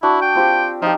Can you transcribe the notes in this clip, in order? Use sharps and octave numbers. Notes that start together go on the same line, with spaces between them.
D4 E4 F#4
G5
C4 F4 G4
F3 D#4 G4